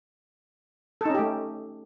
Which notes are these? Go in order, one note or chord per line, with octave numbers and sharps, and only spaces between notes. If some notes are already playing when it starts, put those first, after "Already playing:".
A3 C#4 D#4 G4 A4